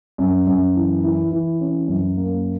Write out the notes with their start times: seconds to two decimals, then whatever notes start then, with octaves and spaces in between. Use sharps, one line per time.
0.18 F#2
0.47 F#2
0.75 E3
1.03 E3
1.31 E3
1.60 C#4
1.88 F#2
2.17 A#3